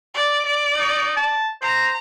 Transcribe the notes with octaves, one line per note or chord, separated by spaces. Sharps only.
D5
D5
D#4
A5
C5 A#5